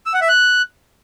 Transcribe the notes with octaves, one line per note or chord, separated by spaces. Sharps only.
E6
F#5
E5
F#6